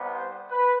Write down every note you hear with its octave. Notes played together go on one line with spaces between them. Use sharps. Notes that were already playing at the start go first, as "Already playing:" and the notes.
Already playing: C2 C3 G3 B3
C5
B4